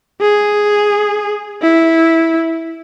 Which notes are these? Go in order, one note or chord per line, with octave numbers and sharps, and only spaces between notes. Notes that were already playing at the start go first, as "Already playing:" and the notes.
G#4
E4